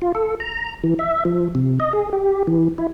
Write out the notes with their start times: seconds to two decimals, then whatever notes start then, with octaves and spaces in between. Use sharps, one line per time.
0.02 F4
0.15 A4
0.40 A#5
0.84 E3
0.99 E5
1.25 F3
1.55 C3
1.80 D#5
1.93 G#4
2.13 G4
2.47 E3
2.78 E4